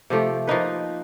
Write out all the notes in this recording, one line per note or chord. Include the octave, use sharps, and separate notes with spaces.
C3 F3 A3 G4
F3 A#3 D#4 B4